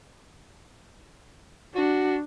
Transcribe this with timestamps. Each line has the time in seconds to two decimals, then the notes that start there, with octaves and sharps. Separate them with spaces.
1.75 D4 F#4